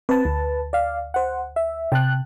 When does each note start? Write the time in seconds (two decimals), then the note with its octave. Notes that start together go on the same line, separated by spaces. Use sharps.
0.09 C4 B4 A5
0.25 D2
0.73 D5 F5
1.14 C5 F#5
1.56 E5
1.92 C3 G5 A5 F#6